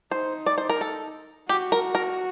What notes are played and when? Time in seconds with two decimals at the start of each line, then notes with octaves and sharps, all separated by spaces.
0.11 D#4 C5
0.46 D5
0.58 C5
0.70 A#4
0.81 A4
1.49 F#4 G4
1.72 A#4
1.95 A#4